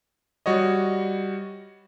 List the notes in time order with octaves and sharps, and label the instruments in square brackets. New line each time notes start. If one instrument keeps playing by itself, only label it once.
[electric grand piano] G3 F#4 C#5 D#5